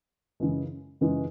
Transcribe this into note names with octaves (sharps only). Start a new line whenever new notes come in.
F#2 C#3 E3 G#3
F#2 C#3 E3 G#3